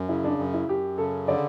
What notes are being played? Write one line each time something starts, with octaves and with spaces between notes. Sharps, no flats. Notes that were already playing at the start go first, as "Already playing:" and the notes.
Already playing: F#2
C#3 E4
D4
F#2
E4
F#2 G4
C#3 A4
D3 D5